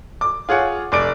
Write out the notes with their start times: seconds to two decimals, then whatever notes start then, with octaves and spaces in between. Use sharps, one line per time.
0.21 D6
0.49 F4 G#4 C#5 F#5
0.92 F1 D5 D7